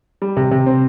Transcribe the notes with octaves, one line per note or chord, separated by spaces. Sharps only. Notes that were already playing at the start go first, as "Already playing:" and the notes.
G3
C3
C3
C4